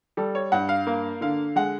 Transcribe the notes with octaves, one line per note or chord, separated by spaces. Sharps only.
G3 A4
C#5
G2 F#5
F5
A#3 F5
D3 F5
G#3 F#5